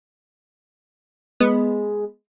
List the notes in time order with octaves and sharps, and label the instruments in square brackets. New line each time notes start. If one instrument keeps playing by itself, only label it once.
[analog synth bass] G#3 [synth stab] B3